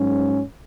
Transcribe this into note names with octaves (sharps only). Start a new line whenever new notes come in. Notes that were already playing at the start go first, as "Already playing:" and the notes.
Already playing: G#2 F#3 C#4